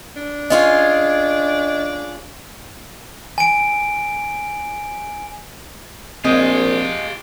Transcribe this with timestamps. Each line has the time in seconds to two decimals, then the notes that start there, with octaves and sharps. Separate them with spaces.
0.16 D4
0.50 C#4 F4 G#4 D#5
3.38 G#5 D7
6.25 A#1 G#3 C4 F4 G4